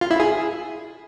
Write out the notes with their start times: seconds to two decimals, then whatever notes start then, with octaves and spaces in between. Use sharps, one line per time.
0.01 F4
0.11 E4
0.20 G#4